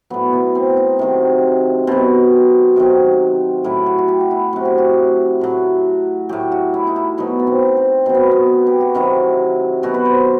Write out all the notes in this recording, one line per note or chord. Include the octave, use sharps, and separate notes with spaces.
A2 F#3 B3
B3
C4
D#4
C3 D#3 F#3
B2 F#3 C4
C3 D#3 F#3
A2 F#3 E4
F#4
F#4
G4
F#4
E4
C3 F#3 F#4
G4
F#4
A2 F#3
A2 F#3 G4
F#4
E4
D#4
E4
B2 F#3 D#4
B3
C4
C4
B2 F#3 C4
B3
B3
G4
F#4
C3 D#3 F#3 E4
B2 F#3 F#4
B4
C5